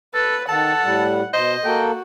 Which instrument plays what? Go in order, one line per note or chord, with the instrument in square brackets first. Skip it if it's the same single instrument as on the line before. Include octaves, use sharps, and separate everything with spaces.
[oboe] A4 [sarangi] B4
[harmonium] D#3 [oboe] A4 [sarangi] F#5 [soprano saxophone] A5
[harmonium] A2 G3
[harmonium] B2 [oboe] C5 [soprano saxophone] D#5
[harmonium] A#3 A4 [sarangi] F#4 [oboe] G5